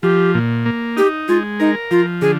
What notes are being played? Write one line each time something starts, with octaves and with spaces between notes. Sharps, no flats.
F3 G4
A#2
A#3
D#4 G4
G#3 F4
D#4 A#4
F3 F4
D3 G#4